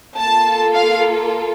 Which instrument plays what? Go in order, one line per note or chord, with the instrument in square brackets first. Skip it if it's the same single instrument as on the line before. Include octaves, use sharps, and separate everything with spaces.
[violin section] A#3 F4 A4 A5
F5